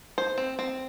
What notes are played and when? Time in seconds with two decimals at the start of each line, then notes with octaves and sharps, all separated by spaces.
0.18 C5
0.38 C4
0.59 C4